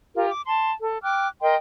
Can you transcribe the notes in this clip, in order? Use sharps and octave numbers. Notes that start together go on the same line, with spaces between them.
F4 G4 A#4
D6
A5 C6
A4
G5 D6 F6 F#6
A#4 D#5 G5 C6